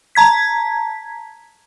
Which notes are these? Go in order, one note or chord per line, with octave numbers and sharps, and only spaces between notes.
A5 A#5 G#6 B6